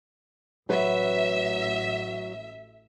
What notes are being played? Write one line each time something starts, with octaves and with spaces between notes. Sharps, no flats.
A1 F#3 B4 E5